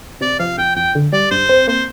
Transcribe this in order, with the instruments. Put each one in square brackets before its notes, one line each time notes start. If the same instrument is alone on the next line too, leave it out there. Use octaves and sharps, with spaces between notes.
[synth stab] C3 [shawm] D5
[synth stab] F3 [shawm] F5
[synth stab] F2 [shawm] G5
[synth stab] F2 [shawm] G5
[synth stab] D3
[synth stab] G3 [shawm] D5
[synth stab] G2 [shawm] C5
[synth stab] C4
[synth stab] A#3 [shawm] C5